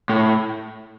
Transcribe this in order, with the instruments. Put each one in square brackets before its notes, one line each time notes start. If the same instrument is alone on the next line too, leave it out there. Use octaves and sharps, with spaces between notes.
[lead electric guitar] A2